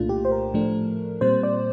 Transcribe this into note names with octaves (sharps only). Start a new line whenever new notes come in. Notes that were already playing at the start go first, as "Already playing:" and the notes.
Already playing: C2 A#2 A3 D4 F4
G4
C5
A#4
A2 F3 A3 D4
A#2 G3 C4 C5
D5